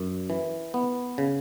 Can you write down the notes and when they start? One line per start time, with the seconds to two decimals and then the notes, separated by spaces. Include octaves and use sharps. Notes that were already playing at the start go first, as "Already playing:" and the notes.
Already playing: F#2
0.30 E3
0.74 B3
1.18 C#3